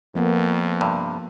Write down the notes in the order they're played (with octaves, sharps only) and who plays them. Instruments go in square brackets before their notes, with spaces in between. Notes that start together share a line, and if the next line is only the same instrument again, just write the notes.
[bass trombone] F2 [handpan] F3 A#3 B3
[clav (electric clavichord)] G2 C3